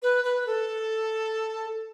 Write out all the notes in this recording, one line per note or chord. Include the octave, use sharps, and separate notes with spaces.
B4
B4
A4